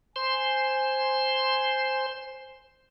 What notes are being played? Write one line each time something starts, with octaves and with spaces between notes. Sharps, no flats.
C5 G#5 C6